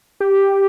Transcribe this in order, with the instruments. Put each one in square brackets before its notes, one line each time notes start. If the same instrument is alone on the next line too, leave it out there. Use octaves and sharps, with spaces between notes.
[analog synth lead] G4